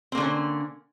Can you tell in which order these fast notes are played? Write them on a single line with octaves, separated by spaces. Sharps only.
C4 A#3 D3 C#4